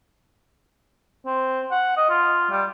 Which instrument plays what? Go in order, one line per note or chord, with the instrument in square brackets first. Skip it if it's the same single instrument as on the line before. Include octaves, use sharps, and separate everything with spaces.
[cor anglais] C4
F#5
D#5
F4
G3